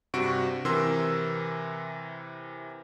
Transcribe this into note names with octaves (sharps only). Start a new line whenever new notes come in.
G2 C3 F#4 C#6 D7
C3 E3 A#4 C6 E6